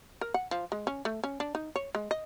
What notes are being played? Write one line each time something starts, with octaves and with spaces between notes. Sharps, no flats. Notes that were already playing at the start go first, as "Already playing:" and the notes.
A#4
F#5
F3
G#3
C#4
A3
C#4
D4
D#4
C#5
G#3
D#5